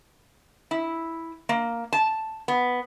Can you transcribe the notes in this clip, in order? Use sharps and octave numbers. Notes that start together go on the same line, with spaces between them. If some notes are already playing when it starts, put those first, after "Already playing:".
E4
A#3
A5
B3